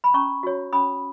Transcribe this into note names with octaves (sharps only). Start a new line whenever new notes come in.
B5
C#4 A#5 C#6
F#4 C#5
C#4 B5 D#6